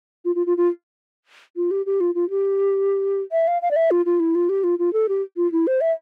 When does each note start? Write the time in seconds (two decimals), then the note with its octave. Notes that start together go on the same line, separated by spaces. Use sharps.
0.25 F4
0.35 F4
0.46 F4
0.57 F4
1.56 F4
1.71 G4
1.86 G4
2.00 F4
2.15 F4
2.30 G4
3.32 E5
3.47 F5
3.62 F5
3.71 D5
3.76 E5
3.91 F4
4.06 F4
4.20 E4
4.35 F4
4.49 G4
4.64 F4
4.79 F4
4.93 A4
5.09 G4
5.37 F4
5.52 E4
5.67 C5
5.81 E5